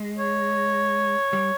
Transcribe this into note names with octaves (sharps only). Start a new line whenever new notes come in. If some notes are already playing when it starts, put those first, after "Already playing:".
Already playing: G#3
C#5
G3